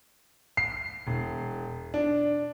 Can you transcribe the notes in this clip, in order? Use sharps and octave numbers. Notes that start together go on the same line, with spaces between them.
C7
E1
D4